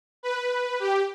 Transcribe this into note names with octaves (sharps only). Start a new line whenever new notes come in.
B4
G4